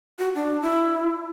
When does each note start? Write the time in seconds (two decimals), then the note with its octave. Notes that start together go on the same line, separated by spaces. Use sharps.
0.19 F#4
0.35 D4
0.62 E4